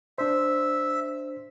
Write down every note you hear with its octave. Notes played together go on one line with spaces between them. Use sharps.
D4 C5 E5